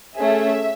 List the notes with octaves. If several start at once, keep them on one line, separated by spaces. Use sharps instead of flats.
A3 C#4 G#4 E5